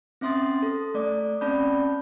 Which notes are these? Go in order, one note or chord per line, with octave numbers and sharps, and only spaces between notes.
C4 C#4 E5 C6 D#6 A6
A4
A3 D5 D6 D#6
C4 C#4 D5 A5 B5 G6